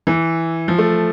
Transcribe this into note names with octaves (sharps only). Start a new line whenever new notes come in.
E3
F3
A3